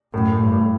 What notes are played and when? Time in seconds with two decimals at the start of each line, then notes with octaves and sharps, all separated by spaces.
0.13 F#2 A2
0.32 A2
0.42 G2
0.52 A2